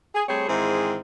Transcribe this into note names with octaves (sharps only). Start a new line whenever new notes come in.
G#4
G3 A3 C4 G#4 C5 C#5
G#2 D#3 E3 C4 E4 G#4